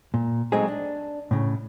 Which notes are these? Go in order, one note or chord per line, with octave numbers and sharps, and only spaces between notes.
A#2
F#3 G#3 A3 C4 D#4 G#4
D4
A2 C#3